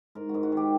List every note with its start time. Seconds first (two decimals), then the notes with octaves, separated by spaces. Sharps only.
0.15 G#2 A#4
0.29 F#4
0.34 G#2
0.43 F#4
0.52 D#3 G4